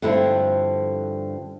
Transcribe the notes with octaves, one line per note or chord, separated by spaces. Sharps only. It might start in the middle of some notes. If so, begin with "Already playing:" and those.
G2 D3 F3 A3 C4 E4